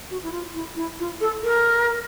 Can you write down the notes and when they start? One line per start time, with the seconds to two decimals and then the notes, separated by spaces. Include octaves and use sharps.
0.10 F#4
0.23 E4
0.31 F4
0.54 E4
0.76 E4
0.99 F4
1.21 A4
1.43 A#4